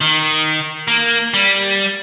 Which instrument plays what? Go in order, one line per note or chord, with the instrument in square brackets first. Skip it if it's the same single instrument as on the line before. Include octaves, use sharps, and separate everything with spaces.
[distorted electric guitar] D#3
A#3
G3